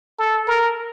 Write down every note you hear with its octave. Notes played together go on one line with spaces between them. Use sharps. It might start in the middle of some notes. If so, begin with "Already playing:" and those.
A4
A#4